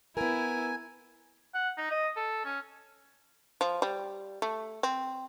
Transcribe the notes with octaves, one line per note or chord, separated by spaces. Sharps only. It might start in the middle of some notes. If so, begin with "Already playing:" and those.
B3 E4 A#4 G#5
F#5
D#4
D#5
A4
C#4
F3
G3
A3
C4